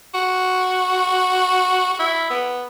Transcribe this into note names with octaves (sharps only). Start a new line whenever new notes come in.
F#4
F#4
E4
B3